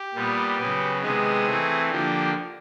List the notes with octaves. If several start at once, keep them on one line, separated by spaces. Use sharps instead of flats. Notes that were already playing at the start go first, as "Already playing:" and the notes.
Already playing: G4
A#2 G3 B3
C#3 F#3 B3
C3 D#3 G#3 B3 G#4
E3 A3 C4
D3 F3 A#3 G4